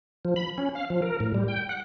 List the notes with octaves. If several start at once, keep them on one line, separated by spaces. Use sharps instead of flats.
F3
B5
C#4
F5
F3
A#4
A2
G3
G5
F#5